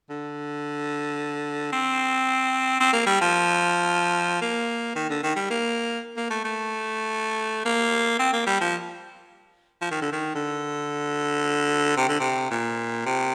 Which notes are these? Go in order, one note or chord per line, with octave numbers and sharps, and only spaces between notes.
D3
C4
C4
A#3
G3
F3
A#3
D#3
D3
D#3
G3
A#3
A#3
A3
A3
A#3
C4
A#3
G3
F3
F3
D#3
D3
D#3
D3
C3
D3
C3
A#2
C3